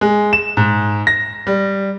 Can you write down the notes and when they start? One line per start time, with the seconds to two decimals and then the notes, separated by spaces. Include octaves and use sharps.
0.01 G#3
0.33 E7
0.57 G#2
1.07 A#6
1.47 G3